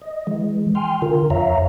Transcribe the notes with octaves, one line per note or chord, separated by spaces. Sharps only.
D#5
E3 G#3
G5 G#5 C6 F6
D3 F4 A#4
F2 C#5 E5 F5 A#5